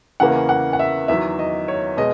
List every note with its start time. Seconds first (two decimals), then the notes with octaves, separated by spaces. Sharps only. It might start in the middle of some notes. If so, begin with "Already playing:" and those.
0.20 E2 C#3 E3 A#3 F#5
0.49 F#5
0.73 F#5
0.79 E5
1.08 E2 D#3 F#3 E5
1.39 D#5
1.68 C#5
1.97 B2 G#3 D#5